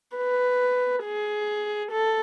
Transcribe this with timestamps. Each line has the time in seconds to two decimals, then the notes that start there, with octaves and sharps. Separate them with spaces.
0.17 B4
1.04 G#4
1.92 A4